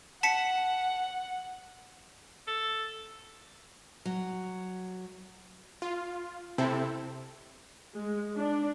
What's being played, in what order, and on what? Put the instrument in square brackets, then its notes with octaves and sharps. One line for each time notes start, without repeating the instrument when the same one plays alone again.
[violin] F#5 [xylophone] A5 B6 C#7
[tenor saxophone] A4
[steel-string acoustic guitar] F#3
[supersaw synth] F4
C3 C4 E4 A4
[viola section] G#3
D4